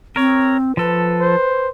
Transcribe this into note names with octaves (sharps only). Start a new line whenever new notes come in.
C4 A#4 C#5
F3 A4 B4
C5